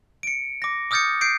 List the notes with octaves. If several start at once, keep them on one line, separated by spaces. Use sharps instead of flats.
C#7 D7
D6 A#6
D6 D#6 F6 G6 A6 C#7
G6 C7 D7